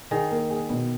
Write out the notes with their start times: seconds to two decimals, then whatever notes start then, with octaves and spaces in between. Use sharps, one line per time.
0.11 D#3 G#4
0.31 A#3
0.50 G#4
0.70 B2